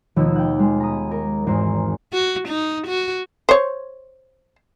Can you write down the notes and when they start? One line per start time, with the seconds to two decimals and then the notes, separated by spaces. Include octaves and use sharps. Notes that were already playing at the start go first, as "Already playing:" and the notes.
0.16 D#2 B2 F3 A3 B3 E6
0.35 F#5 G5
0.59 G#3 B3
0.80 A#5 B5 D#6
1.11 A#4
1.47 G#1 E2 A#4 C5 C6
2.13 F#4
2.48 D#4
2.87 F#4
3.49 C5 C#5